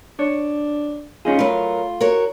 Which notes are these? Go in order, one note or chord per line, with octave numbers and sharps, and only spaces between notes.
D4 C#5
C#4 D#4 F4 G#4
F#3 A3 A#4 B4
F#4 A#4 C#5